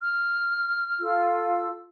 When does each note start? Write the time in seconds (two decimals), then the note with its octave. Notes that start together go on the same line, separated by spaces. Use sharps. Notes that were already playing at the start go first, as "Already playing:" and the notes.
0.02 F6
0.99 F4 A4 E6